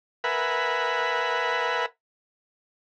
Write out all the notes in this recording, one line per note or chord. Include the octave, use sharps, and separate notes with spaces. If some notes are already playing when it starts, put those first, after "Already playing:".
A#4 B4 E5 F#5 G#5 B5